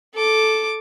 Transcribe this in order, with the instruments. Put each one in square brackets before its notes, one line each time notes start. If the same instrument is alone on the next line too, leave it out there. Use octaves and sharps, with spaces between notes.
[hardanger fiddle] A4 D6